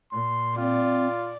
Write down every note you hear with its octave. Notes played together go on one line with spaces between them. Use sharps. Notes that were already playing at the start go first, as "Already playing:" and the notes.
A#2 C6
C4 F4 D5